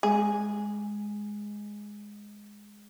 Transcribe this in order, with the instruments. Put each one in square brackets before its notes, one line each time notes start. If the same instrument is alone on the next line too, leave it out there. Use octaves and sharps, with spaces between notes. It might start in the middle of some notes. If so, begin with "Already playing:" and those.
[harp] G#3 [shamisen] G#4